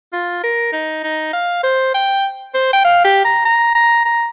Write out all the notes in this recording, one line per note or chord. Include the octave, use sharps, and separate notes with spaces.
F4
A#4
D#4
D#4
F5
C5
G5
C5
G5
F5
G4
A#5
A#5
A#5
A#5